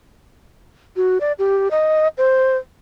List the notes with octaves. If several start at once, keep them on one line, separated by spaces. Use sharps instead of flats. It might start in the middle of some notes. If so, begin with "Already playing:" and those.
F#4
D5
G4
D#5
C5